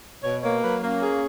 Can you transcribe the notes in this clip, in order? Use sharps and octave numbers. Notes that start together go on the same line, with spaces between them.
B2 C#5
A#3 C#5
F#3 B4
A#3 C#4
G#4